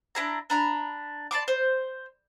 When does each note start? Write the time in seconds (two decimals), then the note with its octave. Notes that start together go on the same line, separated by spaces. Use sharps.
0.15 D4 E4 G#4 A#5
0.50 D4 A#5 B5
1.31 D5 A5 C6 D6
1.48 C5